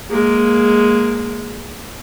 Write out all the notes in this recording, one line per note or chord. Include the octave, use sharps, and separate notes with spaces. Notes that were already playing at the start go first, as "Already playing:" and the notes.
G#3 A#3